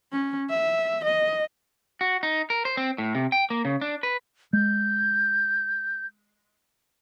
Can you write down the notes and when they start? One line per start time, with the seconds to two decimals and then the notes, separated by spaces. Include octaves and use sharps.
0.12 C#4
0.50 E5
1.04 D#5
2.01 F#4
2.23 D#4
2.50 A#4
2.65 C5
2.77 C4
2.98 A2
3.15 C3
3.32 G5
3.50 A#3
3.65 C#3
3.81 D4
4.03 B4
4.53 G#3 G6